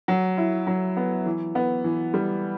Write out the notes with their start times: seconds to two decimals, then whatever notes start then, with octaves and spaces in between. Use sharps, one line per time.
0.08 F#3
0.37 E4
0.67 F#3
0.97 B3
1.26 E3
1.55 B3
1.84 E3
2.14 G3